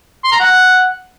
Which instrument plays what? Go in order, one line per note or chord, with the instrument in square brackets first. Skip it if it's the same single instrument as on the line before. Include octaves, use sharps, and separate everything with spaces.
[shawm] C6
A#5
F#5